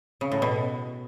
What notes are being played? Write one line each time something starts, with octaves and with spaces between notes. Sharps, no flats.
C#3
A2
B2